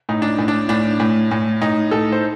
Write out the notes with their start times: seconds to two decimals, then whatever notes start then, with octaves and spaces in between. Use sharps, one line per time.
0.09 A2 D#4
0.22 D4
0.38 A2
0.48 D4
0.69 A2 D4
1.00 A2
1.31 A2
1.62 A2 D#4
1.91 A2 A4
2.12 C5